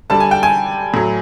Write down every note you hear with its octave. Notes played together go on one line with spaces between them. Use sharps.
D3 G3 A5
G#5
G5
G#5
A2 F#3